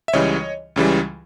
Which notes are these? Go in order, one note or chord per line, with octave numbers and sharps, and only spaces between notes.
E5
C#2 C#3 E3 G3 C#5 D#5
C#2 C#3 E3 G3